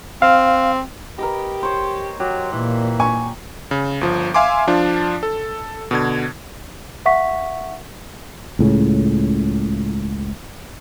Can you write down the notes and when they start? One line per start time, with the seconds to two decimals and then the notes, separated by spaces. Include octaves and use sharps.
0.22 C4 F5
1.18 G4 A#4 B4 D#5
1.63 C5 C#5
2.20 F#3 G4
2.52 A#2 E3
3.00 G#5 C#6
3.71 C#3
4.01 G1 F3
4.34 E5 F5 G#5 C6 D6
4.67 F3 D4 F4
5.23 A4
5.91 B2 D3 G#6
7.06 E5 F#5 C#6 B6
8.59 C#2 A2 C#3